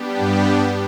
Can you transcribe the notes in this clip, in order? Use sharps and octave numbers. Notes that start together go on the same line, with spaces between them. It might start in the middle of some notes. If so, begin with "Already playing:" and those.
Already playing: G3 B3 D4 G4
G2